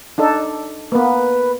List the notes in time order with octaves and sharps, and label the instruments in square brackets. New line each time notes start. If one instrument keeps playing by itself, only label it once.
[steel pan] D4 D#4 A4
[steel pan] A#3 B3 [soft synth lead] B4